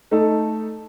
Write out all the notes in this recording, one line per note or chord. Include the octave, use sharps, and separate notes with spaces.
A3 D#4 A4